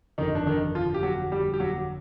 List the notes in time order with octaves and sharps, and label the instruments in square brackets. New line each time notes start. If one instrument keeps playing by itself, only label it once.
[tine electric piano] G1 F2 D3 [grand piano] D#3 D#4
[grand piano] D4
D#3 D#4
F3 F4
G4
F#3 F#4
G3 G4
G4
F#3 F#4